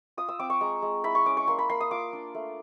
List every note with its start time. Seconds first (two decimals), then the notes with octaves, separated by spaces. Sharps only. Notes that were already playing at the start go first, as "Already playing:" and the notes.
0.17 F4 D#6
0.29 E6
0.39 C4 D6
0.50 C#6
0.61 G#3 A#5
0.82 G#3
1.04 E4 B5
1.15 C#6
1.26 C#4 D6
1.37 C#6
1.48 A#3 C6
1.59 B5
1.69 A#3 C6
1.80 D#6
1.91 F4 D6
2.13 D4
2.34 A3